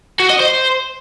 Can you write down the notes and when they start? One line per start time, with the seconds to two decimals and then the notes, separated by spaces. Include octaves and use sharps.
0.19 F#4
0.30 D#5
0.40 C5